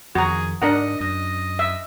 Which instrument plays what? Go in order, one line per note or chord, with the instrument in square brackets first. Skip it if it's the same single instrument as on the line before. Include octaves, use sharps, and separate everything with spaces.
[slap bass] F2 D#3 [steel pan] F#4 A#5 [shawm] G#4
[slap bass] G#2 [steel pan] D4 A#4 F#5 [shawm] D#5
[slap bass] F#2 [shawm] D#5
[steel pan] E5